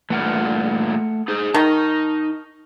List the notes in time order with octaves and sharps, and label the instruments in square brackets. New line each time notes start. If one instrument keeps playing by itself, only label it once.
[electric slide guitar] G2 A#2 E3 [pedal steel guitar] A3 F#5 F6
[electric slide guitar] D#4 G#4 C5
[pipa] D#3 [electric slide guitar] D#4 D#5 [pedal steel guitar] A5 C#6 F6